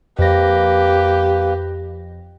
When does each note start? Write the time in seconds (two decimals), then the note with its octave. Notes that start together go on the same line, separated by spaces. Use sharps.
0.19 F2 A#3 G4 B4 A#6